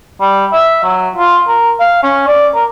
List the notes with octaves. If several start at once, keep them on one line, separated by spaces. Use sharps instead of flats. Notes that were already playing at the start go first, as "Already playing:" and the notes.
G3
E5
F#3
F4
A#4
F5
C#4
D5
A#4